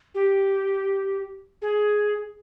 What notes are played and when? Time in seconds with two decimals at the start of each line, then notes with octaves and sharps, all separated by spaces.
0.15 G4
1.62 G#4